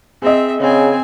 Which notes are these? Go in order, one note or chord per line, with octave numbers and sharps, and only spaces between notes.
C4 G#4 D#5 E5
C#3 C4 G#5